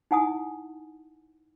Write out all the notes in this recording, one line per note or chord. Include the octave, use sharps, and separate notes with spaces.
D#4 E4 F#5 G#5 A5 D#6